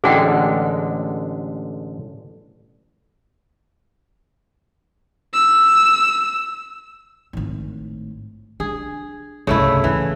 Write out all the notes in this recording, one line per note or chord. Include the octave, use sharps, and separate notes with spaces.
A1 D3 G#3 G#4 F#5 G5
E6
G#1 A2
D4 G#4
C2 G2 C#3 A3 E4
D#2 G#2 E3